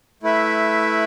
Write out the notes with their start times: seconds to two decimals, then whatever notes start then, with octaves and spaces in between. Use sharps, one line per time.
0.23 A3 E4 B4 E5